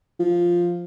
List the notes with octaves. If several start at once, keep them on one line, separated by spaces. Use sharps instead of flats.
F3